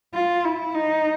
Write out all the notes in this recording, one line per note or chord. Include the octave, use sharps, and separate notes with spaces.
F4
E4
D#4